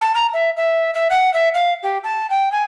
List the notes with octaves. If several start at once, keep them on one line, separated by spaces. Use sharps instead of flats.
A5
A#5
E5
E5
E5
F#5
E5
F5
G4
A5
G5
G#5